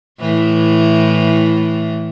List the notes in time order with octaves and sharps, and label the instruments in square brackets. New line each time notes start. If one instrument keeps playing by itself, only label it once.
[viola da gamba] A2 E3